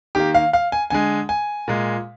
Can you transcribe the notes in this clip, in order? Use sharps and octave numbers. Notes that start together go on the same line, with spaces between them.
D#3 A#3 G4
F5
F5
G#5
D3 G#3 G#5
G#5
A#2 G#3